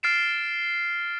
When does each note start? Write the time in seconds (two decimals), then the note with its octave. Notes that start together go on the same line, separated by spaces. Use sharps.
0.03 F6 A6 C7 D7 E7